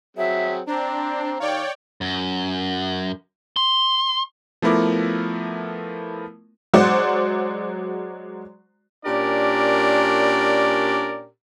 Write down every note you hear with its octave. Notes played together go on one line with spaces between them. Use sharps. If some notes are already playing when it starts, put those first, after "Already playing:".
F#3 C4 G#4 E5
C4 D4 C5 A#5
D#3 C#5 D5 F5 G5
F#2
C6
F3 A3 B3 E4 A#4 D6
F#3 G#3 F#4 C5 D5 F#5
A#2 C#4 D4 G4 A#4 D5